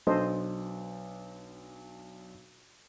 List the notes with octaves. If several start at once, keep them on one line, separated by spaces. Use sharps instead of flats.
B1 D4 A4 C5 D#5